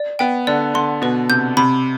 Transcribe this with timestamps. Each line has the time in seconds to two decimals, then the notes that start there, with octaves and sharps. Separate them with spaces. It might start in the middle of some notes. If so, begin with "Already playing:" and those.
Already playing: D5
0.19 B3 G5
0.47 D3 D5
0.74 D3 C6
1.02 B2 B4
1.30 C3 G6
1.57 C3 B5